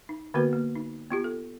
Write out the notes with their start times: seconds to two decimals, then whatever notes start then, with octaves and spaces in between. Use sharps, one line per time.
0.09 D#4
0.34 D3 A#3 B3 F#4 A#4 B4
0.53 A#3
0.75 D#4
1.11 B3 F4 G4
1.24 A4